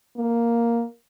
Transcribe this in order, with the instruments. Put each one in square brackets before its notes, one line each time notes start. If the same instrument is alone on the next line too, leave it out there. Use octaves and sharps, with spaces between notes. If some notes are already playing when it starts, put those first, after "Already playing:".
[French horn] A#3